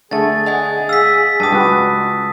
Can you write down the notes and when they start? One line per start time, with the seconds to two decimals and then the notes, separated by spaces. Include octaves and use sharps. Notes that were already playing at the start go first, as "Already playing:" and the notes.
0.11 D3 A3 G#4 A6
0.46 D#5 F#5 G#5
0.89 F5 E6 B6
1.40 G2 G4 A5 D#6
1.53 C#2 F#4 B4